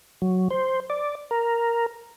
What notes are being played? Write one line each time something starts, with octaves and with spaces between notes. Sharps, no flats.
F#3
C5
D5
A#4